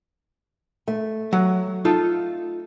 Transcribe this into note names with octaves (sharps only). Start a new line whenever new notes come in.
A3
F#3 F#5
D#4 F4 A4